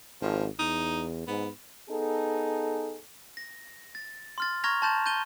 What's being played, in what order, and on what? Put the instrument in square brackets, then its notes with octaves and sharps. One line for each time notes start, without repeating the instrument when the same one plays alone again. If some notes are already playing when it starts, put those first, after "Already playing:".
[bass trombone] G#1 [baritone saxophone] F3
[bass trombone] E2 [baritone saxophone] D#4
[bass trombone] G#2 [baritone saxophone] B3
[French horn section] B3 D#4 G#4 A4
[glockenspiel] A#6
A6
C6 F6 A6
A#5 C#6 F6 G#6 A#6 F7
A5 C6 G6 A6 E7
G6 A6 D#7 G7